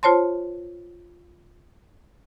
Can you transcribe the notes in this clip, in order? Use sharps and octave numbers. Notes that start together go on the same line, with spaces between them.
F4 C5 C#5 A5 C6